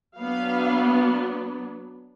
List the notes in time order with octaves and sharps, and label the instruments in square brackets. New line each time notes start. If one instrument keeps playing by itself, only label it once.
[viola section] F#3 B3 D4 F5